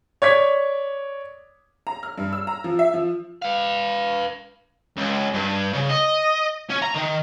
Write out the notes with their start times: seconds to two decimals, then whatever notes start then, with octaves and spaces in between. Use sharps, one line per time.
0.22 C#5 D5 G#6 B6
1.87 A#5
2.03 F6
2.18 G2
2.33 E6
2.47 A#5
2.64 F3
2.79 E5
2.94 F3
3.42 B4 F5
4.97 C#2
5.34 G2
5.74 C#3
5.90 D#5
6.70 C#4
6.82 A#5
6.95 D#3